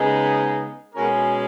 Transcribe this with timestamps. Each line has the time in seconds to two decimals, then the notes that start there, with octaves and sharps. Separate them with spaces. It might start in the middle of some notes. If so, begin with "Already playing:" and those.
Already playing: C#3 G#3 B3 D#4
0.93 B2 G#3 C#4 F#4 A#4